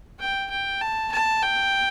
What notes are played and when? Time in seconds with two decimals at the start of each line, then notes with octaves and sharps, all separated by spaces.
0.20 G5
0.50 G5
0.81 A5
1.12 A5
1.43 G5